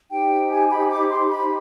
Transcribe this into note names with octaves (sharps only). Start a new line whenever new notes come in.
D#4 G4 C5 G5
G#5
B5
D6
C6
B5